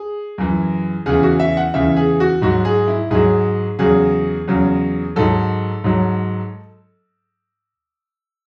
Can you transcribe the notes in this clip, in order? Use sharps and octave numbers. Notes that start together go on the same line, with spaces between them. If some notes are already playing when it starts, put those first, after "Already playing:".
Already playing: G#4
F#2 E3
E2 C#3 E3 G#4
F#4
E5
F#5
E2 C#3 E3 E5
G#4
F#4
G#2 F#3 F#4
G#4
E4
G#2 F#3 G#4
E2 C#3 F#3 G#4
E2 C#3 F#3
G#2 F#3 A4
G#2 F#3